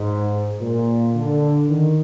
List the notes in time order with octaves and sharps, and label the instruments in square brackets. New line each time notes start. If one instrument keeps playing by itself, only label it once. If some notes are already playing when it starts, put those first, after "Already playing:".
Already playing: [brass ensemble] G#2
A#2
D3
D#3